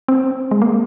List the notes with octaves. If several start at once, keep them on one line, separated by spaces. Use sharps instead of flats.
C4
G#3
A#3